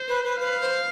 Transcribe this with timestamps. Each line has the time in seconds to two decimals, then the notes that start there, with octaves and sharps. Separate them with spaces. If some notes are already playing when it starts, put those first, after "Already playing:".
Already playing: C5
0.08 B4
0.25 B4
0.40 B4 F5
0.61 C5